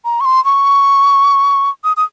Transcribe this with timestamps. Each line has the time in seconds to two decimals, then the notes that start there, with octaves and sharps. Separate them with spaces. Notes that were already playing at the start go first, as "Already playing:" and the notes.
0.05 A#5
0.21 C#6
0.25 C6
0.45 C#6
1.84 D#6
1.97 D#6